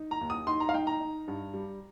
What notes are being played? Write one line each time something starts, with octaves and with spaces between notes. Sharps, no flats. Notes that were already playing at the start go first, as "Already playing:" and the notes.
Already playing: D#4
A#5
D#2
D#6
D#4 C6
A#5
F5
D#4 G5
A#5
D#4
G2
G3